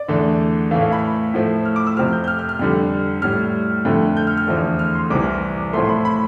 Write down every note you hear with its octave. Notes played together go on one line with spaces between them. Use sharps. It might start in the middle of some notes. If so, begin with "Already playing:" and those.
Already playing: D5
E2 D3 A3
A2 E3 A3 F5
F5
B5
A2 F3 A3
F6
D6
E6
F2 C3 F3 F6
G6
G6
F6
F6
F6
F2 D3 G3
A2 G3 F6
F2 D3 A3
G6
F6
F6
E2 D3 F3 A3
F6
C6
C2 C3 E3 D6
A2 F3 A3 C6
C6
B5
B5